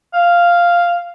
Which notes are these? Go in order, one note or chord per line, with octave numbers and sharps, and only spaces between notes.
F5